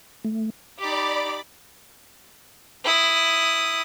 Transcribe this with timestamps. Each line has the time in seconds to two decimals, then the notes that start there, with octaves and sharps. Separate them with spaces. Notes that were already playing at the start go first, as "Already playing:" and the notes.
0.25 A3
0.79 D#4 G4 D5 B5 D6
2.84 E4 D#6